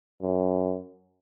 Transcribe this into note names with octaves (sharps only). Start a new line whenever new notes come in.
F#2